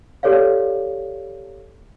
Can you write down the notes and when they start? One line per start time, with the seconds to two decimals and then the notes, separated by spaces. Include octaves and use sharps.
0.23 G4 A4 C#5 D5 F5